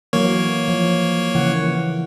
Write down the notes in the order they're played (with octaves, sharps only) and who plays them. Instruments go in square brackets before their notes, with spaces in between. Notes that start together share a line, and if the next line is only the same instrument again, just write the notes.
[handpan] E3 F#3 [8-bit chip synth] A#3 C#5
[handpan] F3
C#3 E3 F#5